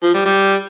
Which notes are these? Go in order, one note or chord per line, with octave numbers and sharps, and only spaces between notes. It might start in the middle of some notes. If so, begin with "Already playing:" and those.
F3
G3
G3